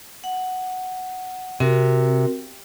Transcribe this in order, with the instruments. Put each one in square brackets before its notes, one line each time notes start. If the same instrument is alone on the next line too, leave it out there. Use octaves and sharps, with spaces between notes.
[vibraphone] F#5
[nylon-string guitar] C3 [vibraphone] C4 F#4 A#4